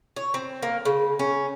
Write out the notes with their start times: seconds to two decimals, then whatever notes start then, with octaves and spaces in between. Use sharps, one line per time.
0.16 C#5
0.34 C4
0.63 A#3
0.85 C#3
1.19 C#4